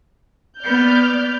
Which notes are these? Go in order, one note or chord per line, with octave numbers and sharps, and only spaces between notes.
B3 D5 F6 G6